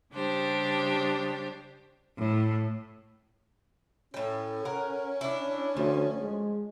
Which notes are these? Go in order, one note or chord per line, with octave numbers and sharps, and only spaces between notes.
C#3 G3 D4 G4 C5
A2
A2 C#4 G5
A#4 F#5
D4 E4
D2 F3
G#3